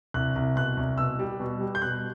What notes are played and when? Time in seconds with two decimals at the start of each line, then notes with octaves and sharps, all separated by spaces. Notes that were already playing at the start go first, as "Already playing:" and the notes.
0.14 C2 F#6
0.36 C2
0.56 B2 F#6
0.77 C2
0.98 B2 E6
1.19 G3
1.40 B2
1.61 G3
1.75 G6
1.82 B2 F#6